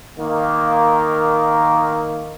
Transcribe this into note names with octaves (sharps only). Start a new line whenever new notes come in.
D#3 A#3